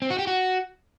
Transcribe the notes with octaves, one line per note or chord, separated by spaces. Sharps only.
C4
F#4
G4
F#4